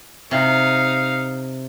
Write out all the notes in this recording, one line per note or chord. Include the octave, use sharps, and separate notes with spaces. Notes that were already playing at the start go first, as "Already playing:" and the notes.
C3 D#4 F5